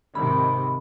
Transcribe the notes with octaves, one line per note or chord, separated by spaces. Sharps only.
G#2 C3 D#3 B5